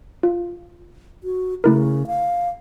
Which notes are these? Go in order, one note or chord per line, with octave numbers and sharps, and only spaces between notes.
F4
F#4
C#3 A3 E4 A#4
F5